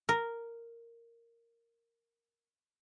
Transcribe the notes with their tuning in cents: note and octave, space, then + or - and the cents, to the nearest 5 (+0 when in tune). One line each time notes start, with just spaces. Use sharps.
A#4 -5